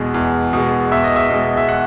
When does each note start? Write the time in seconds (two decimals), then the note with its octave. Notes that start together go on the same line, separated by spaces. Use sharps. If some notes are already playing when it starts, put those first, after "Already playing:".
Already playing: E2 B2 G#3
0.14 E2
0.53 B2 G#3
0.91 E2 E5
1.04 D#5
1.16 E5
1.30 B2 G#3
1.57 E5
1.69 F#5